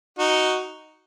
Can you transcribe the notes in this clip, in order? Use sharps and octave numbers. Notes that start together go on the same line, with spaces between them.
D#4 F#4